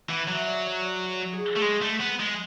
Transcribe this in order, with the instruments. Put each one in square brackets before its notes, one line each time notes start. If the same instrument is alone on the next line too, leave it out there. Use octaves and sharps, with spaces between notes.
[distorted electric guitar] E3 [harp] F#5
[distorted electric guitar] F#3 [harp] E5
[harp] D5
C#5
D5
F#4
G#4
F#4
G#4
[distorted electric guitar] A3
[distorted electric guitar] G#3 [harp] F#4
[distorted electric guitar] A3
B3
G#3